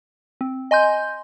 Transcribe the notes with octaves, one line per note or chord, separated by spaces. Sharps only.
C4
D#5 G#5 C6 G6